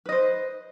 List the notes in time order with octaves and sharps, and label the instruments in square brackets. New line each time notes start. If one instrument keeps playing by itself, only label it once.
[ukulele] B4
D#5
C5